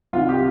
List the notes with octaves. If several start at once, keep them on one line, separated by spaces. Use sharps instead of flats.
C2 C3 D#3 F4
G4